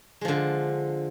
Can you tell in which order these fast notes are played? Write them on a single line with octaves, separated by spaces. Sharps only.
G#3 F3 D3